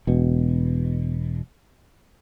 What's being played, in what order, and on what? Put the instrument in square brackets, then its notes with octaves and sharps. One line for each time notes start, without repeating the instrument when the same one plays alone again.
[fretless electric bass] E1 B2